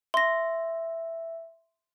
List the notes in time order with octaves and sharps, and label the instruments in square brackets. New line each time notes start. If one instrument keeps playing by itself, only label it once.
[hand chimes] E5 [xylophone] C6 A#6